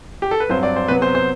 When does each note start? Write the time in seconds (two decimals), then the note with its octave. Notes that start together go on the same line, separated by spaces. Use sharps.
0.22 G4
0.31 A4
0.40 B4
0.49 G2 F#3 C4 C5
0.63 D5
0.76 C5
0.88 C3 F#3 B3 B4
1.02 C5
1.15 C5